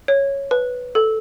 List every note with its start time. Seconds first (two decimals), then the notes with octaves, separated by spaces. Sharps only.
0.08 C#5
0.51 B4
0.95 A4